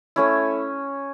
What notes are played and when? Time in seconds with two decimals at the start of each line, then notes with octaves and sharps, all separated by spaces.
0.16 A3 C#4 E4